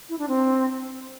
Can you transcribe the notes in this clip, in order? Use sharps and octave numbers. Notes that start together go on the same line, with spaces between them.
E4
D4
C4